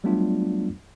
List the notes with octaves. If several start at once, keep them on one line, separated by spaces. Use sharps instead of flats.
F#3 G3 A3 B3 D4 F4